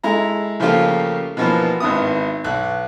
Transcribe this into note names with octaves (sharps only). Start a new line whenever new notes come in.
G#3 E4 A4 A#5
C#3 F3 A3 A#3 F4 G4
B2 E3 F3 A#3 B3
G#1 D#3 B3 E4 D#6
B1 F#6